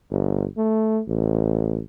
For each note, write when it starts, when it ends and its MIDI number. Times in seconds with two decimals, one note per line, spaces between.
0.10 0.45 31
0.57 1.01 57
1.07 1.80 33